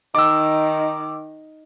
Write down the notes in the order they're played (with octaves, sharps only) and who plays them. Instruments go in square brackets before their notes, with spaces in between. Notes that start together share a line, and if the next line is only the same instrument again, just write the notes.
[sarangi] D#3 [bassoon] D#4 [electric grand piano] D6 E6